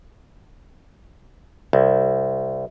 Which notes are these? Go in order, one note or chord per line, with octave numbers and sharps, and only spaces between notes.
C2